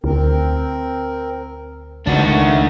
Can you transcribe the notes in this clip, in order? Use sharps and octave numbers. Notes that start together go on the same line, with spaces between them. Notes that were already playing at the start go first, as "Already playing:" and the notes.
D2 C4 A#4
C#2 D#3 A3 D4 D#4 F#4